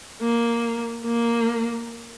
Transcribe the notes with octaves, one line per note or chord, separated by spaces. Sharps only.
A#3
A#3